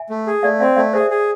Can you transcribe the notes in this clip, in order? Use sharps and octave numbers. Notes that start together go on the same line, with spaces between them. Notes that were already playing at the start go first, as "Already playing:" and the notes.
Already playing: E5 G#5
A3
G#4
A3 D5 F5
C4 D5 F5
A3 D5 F5
G#4 C5 E5
G#4